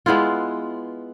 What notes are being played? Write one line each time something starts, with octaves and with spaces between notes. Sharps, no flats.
G#3 B3 E4 F4